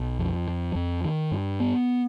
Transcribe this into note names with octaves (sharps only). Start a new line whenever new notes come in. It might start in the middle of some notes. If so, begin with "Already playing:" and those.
Already playing: B1
F2
F3
F2
D#3
G2
B3